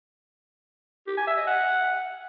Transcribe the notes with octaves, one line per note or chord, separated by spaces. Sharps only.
G4
G#5
E5
D#5
F#5